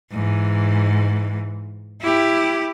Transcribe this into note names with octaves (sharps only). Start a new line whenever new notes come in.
G#2 E3
E4 G4